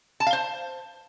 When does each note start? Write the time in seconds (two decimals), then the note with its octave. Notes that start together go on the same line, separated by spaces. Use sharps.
0.20 A5
0.27 F5
0.33 C5